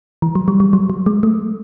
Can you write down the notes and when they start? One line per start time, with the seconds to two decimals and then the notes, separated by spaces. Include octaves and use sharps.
0.22 E3
0.35 F#3
0.48 G3
0.60 G3
0.73 F#3
0.90 F#3
1.06 G#3
1.23 A3